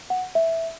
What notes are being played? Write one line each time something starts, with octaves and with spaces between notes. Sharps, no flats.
F#5
E5